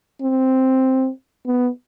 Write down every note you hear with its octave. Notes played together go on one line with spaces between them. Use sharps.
C4
B3